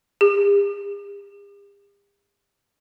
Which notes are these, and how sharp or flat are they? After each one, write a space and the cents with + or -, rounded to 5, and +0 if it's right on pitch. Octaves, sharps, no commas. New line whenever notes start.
G4 +45